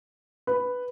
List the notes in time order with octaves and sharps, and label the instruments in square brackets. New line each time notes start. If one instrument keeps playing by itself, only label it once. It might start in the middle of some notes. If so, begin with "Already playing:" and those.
[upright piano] B4